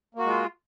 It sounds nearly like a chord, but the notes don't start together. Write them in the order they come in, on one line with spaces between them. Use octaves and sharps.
A#3 F#4 G#3 F4